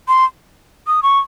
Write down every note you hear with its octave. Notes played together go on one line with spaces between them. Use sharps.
C6
D#6
C#6